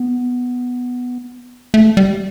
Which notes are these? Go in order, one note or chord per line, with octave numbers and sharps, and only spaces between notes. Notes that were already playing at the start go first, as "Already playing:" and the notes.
Already playing: B3
A3
G3